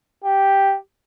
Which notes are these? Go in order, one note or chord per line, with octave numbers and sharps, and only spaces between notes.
G4